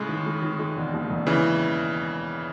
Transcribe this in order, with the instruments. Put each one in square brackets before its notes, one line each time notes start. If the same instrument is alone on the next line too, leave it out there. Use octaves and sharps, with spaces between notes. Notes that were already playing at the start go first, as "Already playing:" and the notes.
Already playing: [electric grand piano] A2 C#3 [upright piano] G#3
[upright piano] D#3
G#3
D#3
G#3
E1
D#2
E1
[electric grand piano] C#3 E3